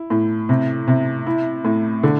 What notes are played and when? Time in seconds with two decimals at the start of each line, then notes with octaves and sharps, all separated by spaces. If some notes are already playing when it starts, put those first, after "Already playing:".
Already playing: E4
0.10 A2
0.49 C3
0.88 C3
1.27 E4
1.65 A2
2.03 D3